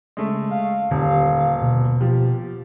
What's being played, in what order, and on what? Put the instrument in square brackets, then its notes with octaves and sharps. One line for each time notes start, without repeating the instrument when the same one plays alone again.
[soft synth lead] C#3 [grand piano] G#3 A3
[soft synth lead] F5
[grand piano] D#1 [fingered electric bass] D3
[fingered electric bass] B2
[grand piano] F3 [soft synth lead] G4